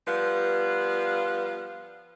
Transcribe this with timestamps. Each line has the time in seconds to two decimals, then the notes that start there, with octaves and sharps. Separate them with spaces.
0.07 F3 G3 B3 B4 F5